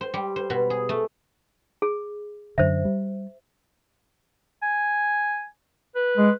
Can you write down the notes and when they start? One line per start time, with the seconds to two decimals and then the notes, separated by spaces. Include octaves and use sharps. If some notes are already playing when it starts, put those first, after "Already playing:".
0.01 C5
0.14 G3
0.36 C5
0.50 B2
0.70 G#4
0.89 A3
1.82 G#4
2.58 F#2 D3 C5 E5
2.85 G3
4.62 G#5
5.95 B4
6.17 G#3